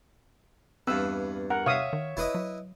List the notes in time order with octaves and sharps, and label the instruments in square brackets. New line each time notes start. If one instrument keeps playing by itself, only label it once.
[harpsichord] E2 G2 [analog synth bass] C4 [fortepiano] B4 F5 [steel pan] E6
[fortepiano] A#4 [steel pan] F#5
[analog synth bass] C3 [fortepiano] C#5 E5 [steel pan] F5 D#6
[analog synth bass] D#3
[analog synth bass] F1 [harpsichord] E4 B4 D#5
[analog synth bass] F#3